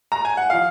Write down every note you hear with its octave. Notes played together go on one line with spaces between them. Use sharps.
A#5
G#5
F#5
F3 F5